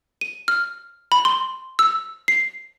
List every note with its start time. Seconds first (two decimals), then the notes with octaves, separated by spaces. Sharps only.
0.21 D#7
0.48 F6
1.12 B5
1.25 C6
1.79 E6
2.28 C7